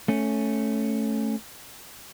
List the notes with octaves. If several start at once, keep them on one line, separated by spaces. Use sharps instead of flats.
A3 C#4